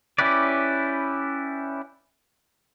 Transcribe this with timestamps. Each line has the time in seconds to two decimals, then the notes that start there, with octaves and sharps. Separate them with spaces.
0.18 C#4 E4 G4 B4 D5